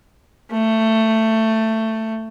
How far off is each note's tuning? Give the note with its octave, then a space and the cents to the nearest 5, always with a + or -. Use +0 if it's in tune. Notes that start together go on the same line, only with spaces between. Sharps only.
A3 +15